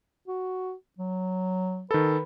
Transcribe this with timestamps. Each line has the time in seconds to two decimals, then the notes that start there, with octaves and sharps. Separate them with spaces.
0.28 F#4
0.98 F#3
1.91 D#3 A4 B4